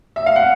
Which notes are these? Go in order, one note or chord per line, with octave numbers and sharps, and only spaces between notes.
E5
F5
F#5